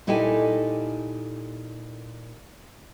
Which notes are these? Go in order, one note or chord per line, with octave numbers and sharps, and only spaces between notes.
A#2 D#4 E4 G4 A4 G#5